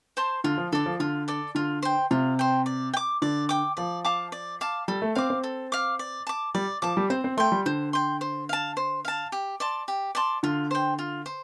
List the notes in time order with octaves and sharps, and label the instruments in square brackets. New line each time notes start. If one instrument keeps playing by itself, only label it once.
[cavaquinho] C5 A5 C6
[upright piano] D3 [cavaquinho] F4
[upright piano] F3
[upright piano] D3 [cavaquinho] A4 D5
[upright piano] F3
[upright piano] D3 [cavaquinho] F4
[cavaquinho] A4 D5
[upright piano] D3 [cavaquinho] F4
[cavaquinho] C5 G5
[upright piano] C3 [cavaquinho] F4
[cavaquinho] C5 G5
D5
G5
D6
[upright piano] D3 [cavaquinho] D5
[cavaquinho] G5 D6
[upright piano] F3 [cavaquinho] D5
[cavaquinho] F5 A5 D6
D5
F5 A5 D6
[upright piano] G3 [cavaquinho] A4
[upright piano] A3
[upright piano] C4 [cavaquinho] F5 D6
[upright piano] C4
[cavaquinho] A4
F5 D6
D5
A5 D6
[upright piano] G3 [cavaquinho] D5
[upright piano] F3 [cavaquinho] A5 D6
[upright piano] G3
[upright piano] C4 [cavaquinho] C5
[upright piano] C4
[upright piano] A3 [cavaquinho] G5 C6
[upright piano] G3
[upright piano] D3 [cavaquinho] C5
[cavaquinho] G5 C6
C5
F5 A5
C5
F5 A5
G4
D5 A5 C6
G4
D5 A5 C6
[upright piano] D3 [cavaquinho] F4
[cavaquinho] C5 G5
F4
C5